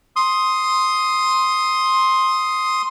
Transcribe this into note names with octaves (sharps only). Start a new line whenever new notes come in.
C6 D#6